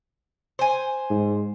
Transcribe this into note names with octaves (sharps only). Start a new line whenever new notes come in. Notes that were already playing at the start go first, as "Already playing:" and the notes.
C5 G#5
G#2